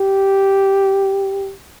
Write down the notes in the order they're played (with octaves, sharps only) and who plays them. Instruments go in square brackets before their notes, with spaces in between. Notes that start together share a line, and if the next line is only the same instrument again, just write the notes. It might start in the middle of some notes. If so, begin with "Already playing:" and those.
Already playing: [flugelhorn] G4